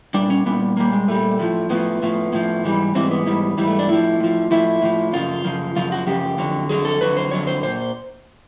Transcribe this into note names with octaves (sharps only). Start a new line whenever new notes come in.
A#2 G3 D4
C#4
A#2 G3 B3
A#2 G3 A#3
G#3
A#2 G3 A3
A2 F3
A2 F3 B3
A2 F3
A2 F3
G#2 E3 G3
G#2 E3 G3 C4
B3
G#2 E3 G3
G#2 E3 G3
A3
D4
A2 F3 E4
A2 F3
A2 F3 E4
A2 F3
F#2 C#3 F3 F4
F#2 C#3 F3
F#2 C#3 F3 F4
F#4
F#2 C#3 F3 G4
F2 D3 F#3
F2 D3 F#3 G#4
A4
F2 D3 F#3 B4
C5
F2 D3 F#3 C#5
C5
A#2 C5